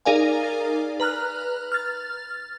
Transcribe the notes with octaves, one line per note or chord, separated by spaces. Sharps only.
D#4 G#4 A#4 D5 F5 G#5
B4 A#5 F6 F#6
F6 A6